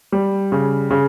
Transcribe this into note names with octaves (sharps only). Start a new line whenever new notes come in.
G3
C#3
C#3